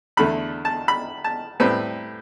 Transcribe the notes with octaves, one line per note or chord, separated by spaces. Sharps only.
E2 D3 A3 B5
A5
B5
A5
A2 G3 C4 B4